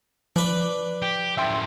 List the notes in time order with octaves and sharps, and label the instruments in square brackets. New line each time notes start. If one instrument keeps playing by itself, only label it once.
[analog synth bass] F3 [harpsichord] D4 B4 [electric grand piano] D6
[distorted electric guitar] G4
[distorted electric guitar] F#2 A2 [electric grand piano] E5 G5 C6